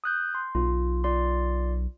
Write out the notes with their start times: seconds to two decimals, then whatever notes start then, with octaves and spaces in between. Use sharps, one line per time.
0.04 D#6 F#6 G6
0.35 C6
0.55 B1 F4
1.04 F4 D5 C6